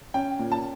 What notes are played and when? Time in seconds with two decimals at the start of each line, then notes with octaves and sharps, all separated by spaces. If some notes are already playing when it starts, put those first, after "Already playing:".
0.14 C#4 G5
0.39 A#2
0.52 A5